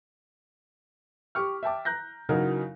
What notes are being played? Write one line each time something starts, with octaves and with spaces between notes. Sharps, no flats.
G4 C#6 F6
E5 G5 A5 D6
A#5 F#6 G6 A#6
C#3 E3 F#3 D#4 F#4 A#4